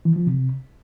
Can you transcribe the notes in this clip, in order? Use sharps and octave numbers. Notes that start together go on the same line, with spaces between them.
E3
F3
C3